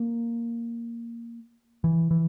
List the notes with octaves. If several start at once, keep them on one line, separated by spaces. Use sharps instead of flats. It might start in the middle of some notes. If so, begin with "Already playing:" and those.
Already playing: A#3
E3
E3